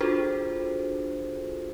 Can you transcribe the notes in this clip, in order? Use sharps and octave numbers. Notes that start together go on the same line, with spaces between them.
D4 F4 F#4 G#4 A4 C5